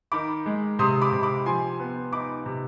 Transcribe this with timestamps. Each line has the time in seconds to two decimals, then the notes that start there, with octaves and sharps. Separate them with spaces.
0.12 D#3 B5 D6
0.46 G#3
0.79 C3 C6 D#6
1.01 B5 D6
1.12 C3
1.23 B5 D6
1.46 F3 G#5 C6
1.80 B3
2.13 D#4 B5 D6
2.46 C3